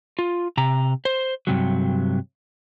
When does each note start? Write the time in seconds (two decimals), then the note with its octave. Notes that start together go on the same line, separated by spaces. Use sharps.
0.19 F4
0.57 C3 A#5
1.05 C5
1.47 G2 C3 F#3